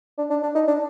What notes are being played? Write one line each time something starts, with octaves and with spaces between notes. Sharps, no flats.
D4
D4
D4
D#4
D4